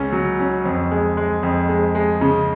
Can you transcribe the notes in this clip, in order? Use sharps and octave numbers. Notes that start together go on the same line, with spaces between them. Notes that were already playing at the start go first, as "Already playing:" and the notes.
Already playing: C#2 C#4
F#3
C#4
F2
G#3
G#3
F2
G#3
G#3
C#3